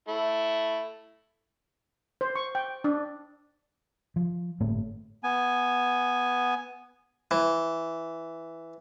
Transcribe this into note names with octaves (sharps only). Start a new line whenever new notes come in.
A3 E4
C5
C#6
G5
D4
F3
G1 A2 A3 A#3
B3 G#5
E3